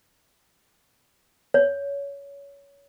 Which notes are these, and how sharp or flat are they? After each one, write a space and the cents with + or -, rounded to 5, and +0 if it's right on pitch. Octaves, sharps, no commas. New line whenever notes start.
C#5 +20